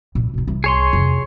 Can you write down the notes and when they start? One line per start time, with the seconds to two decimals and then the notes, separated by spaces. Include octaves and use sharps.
0.15 A#2
0.34 B2 D#4
0.48 C2
0.64 G#4 C#5 C6
0.93 F2 C3